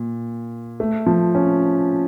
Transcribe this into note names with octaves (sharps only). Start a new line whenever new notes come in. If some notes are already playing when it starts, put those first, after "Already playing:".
Already playing: A#2
A3
F3
C#4